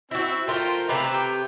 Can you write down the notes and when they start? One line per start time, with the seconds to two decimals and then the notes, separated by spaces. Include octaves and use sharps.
0.11 C4 E4 F#4 E6
0.48 A3 F4 A#4 C5 G5
0.89 C3 A3 B4 E5 A#5 D6
1.13 G5